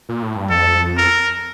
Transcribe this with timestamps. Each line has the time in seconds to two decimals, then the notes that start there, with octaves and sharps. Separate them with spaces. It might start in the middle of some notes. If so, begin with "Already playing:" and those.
0.09 A#2
0.23 A2
0.36 G2
0.50 F2 A4
0.98 A#4